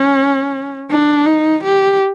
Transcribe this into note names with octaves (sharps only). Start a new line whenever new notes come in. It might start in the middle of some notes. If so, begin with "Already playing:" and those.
Already playing: C#4
D4
D#4
G4